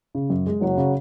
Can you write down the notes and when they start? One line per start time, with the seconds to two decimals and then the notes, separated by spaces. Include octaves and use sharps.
0.15 C#3
0.30 F#2
0.47 G#3
0.61 F#1 F#3
0.77 C#3